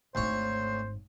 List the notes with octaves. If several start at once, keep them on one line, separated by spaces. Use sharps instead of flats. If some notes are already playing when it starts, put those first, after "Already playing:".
G#1 D2 G#2 C5 C#5